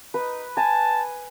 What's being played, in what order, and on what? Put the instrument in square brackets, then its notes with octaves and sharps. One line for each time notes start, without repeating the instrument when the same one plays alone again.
[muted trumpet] D#4 [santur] B4
[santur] G#5 [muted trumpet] A5